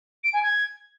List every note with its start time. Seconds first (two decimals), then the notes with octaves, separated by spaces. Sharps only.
0.24 D7
0.33 G#5
0.43 G#6